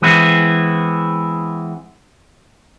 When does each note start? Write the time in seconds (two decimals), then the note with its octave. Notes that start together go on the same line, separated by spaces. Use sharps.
0.02 E3 G#3 B3 C4 E4